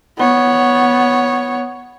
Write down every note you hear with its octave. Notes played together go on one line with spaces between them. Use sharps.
B3 C#5